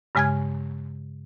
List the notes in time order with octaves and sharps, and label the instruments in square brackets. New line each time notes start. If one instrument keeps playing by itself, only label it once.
[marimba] G2 C#3 G#3 G#5 F6 G#6